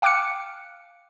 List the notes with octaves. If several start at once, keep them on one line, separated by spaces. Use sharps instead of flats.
F5 G5 D6 F6 F#6 C#7